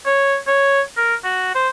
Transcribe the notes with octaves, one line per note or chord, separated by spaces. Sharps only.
C#5
C#5
A#4
F#4
C5